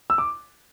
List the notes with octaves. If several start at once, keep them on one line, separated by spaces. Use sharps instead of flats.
E6
D6